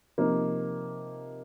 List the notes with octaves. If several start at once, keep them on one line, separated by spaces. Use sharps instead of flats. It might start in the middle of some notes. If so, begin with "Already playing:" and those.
C3 F3 A#3 D#4